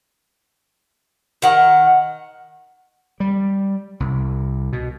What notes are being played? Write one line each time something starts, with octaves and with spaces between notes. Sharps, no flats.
D#3 F#5
G3
C2
B2